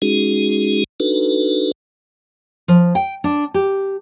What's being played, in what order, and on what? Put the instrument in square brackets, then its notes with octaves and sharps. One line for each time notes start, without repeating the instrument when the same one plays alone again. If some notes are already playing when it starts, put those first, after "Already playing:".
[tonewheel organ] G#3 C#4 D#4 F#4 G#4
D4 D#4 F#4 A4 B4
[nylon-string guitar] F3
G5
D4
G4